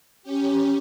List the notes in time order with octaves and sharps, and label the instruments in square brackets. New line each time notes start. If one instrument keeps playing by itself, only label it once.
[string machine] C#4 G4